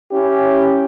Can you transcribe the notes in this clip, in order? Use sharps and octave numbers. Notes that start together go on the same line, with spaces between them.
C#4 E4 G4